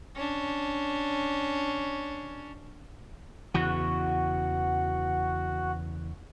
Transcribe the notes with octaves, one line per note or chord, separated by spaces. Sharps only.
C#4 D4
E2 C#3 E3 F#4